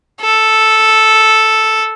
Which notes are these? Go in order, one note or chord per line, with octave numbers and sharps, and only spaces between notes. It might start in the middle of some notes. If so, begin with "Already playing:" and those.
A4